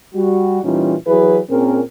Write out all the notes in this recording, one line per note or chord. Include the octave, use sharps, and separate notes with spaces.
G3 F#4
A#2 E3 G3 C#4 D#4 F4
E3 F#3 E4 G#4 B4
A#2 C4 C#4 G#4 A#4